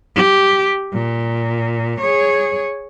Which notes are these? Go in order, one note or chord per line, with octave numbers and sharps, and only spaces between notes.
G4
A#2
G#4 C#5